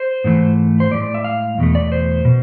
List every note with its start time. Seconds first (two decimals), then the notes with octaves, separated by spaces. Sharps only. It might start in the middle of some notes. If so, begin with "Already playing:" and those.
Already playing: C5
0.24 G#2 E3 A3
0.80 C5
0.91 A2 G#3 D5
1.14 E5
1.24 F5
1.58 E2 B2 A3
1.75 D5
1.92 C5
2.25 B2